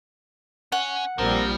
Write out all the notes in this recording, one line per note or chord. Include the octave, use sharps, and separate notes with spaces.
C#4 F#5
A#1 F3 G3 C4 A#4